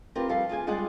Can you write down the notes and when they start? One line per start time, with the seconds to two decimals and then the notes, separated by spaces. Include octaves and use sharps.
0.15 C4 F4 G4 A#4 B4
0.29 F3 G3 A4 F5 A5
0.49 F4 G#4 G5 G#5
0.67 G3 G#3 F4 G#4 D5 F#5